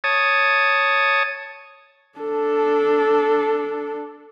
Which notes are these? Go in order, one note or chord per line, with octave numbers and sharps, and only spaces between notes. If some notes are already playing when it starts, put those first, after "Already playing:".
C#5 A5 D#6
D4 A4